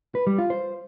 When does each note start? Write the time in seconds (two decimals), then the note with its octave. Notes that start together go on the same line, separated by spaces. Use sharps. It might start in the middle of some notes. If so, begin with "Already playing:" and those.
0.15 B4
0.27 G3
0.38 F4
0.50 C5